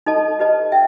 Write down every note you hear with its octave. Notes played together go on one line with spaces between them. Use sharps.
D#4 A4 D#5 A5
G4 B4 D#5 A5
E5 G5